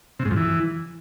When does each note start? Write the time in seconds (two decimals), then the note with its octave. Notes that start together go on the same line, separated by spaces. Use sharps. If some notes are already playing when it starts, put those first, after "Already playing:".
0.19 C3
0.25 G#2
0.31 F2
0.36 E3